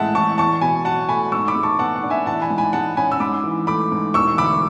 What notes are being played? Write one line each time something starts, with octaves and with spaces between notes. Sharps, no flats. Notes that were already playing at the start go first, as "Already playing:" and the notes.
Already playing: A1 A2 G#3 E5 F#5 A5
A1 A5 C#6
E2 A5 C#6
B2 G#5 B5
F#3 F#5 A5
A3 G#5 B5
G#2 C#6 E6
B5 D6
G#3
A5 C#6
B3 F#5 A5
F#5
D4
E5 G#5
A1 F#5 A5
G#5 B5
G#2
G#5 B5
G#3 F#5 A5
C#4 G#5 B5
E6
G#2 B5 D6
E3
A3 B5 D6
G#2
E1 C#6 E6
D2 B5 D6